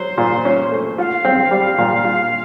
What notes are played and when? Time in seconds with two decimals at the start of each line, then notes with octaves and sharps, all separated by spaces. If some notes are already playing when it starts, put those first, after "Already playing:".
Already playing: F#3 C5
0.18 A#2
0.45 C#4
0.72 A3
0.98 F4 F5 F#5
1.25 C4
1.51 G3
1.78 A#2
2.05 F4